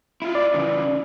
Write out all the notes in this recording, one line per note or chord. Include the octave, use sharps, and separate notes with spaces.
E4 F4
D5
C#3 E3